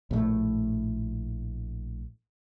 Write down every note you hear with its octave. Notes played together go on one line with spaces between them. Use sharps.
A#1 A2 C3 A3